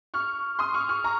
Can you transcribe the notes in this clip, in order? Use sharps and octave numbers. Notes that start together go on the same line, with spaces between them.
C#6 F6
C6 D#6
C#6 F6
C#6 F6
A#5 C#6